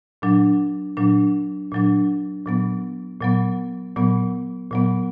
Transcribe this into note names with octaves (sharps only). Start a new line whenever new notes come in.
A#2 F#3 D4
A#2 F#3 D4
A#2 F#3 D4
A#2 F#3 B3
A#2 F#3 B3
A#2 F#3 B3
A#2 F#3 B3